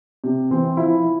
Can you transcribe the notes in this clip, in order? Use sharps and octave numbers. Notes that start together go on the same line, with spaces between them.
C3
E3 C4
F3 E4
F3